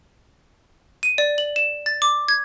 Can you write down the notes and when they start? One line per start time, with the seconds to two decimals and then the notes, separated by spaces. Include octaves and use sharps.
1.03 D#7
1.18 D5
1.38 F#7
1.56 E7
1.86 A6
2.02 D6
2.28 G#6